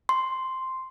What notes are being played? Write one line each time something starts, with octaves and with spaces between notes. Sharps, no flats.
C6